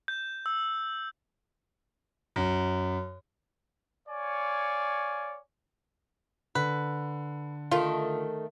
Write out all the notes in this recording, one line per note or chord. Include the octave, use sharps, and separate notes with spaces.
G6
E6
F#2
C#5 D5 F5 G#5 C#6
D3 B4
D#3 A3 F4